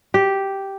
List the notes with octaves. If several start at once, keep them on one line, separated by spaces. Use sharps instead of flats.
G4